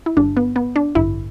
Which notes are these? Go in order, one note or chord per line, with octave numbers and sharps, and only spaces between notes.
E4
G1 G2 D3 D4
B3
B3
D4
A1 G2 D3 E4